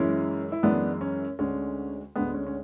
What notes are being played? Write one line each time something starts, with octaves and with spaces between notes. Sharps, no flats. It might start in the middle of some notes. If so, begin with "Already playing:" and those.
Already playing: F#2 E3 G#3 C#4 E4
E4
F#2 E3 G#3 B3 D4
C#4
D2 D3 G#3 C#4
D2 D3 G#3 B3
C#4
C#4